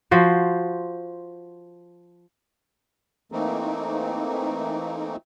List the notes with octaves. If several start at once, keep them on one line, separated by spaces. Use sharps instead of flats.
F3 F#4 C5
E3 A3 A#3 C4 D#4